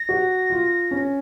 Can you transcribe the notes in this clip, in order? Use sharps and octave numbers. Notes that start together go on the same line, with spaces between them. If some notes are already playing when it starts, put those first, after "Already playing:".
Already playing: A#6
F#4
F4
C#4